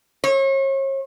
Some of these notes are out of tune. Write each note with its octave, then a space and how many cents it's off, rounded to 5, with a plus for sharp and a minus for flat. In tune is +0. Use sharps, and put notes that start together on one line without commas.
C#5 -40